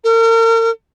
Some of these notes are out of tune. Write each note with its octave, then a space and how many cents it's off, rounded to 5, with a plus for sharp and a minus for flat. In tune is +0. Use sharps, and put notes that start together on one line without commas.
A#4 -40